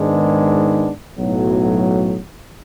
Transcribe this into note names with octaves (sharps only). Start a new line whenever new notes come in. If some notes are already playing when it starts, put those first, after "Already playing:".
Already playing: G#2 D#3 G#3 B3 D4
B1 A2 F#3